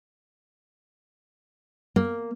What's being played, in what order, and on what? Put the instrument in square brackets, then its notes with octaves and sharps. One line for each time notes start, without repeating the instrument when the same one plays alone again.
[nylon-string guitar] A#3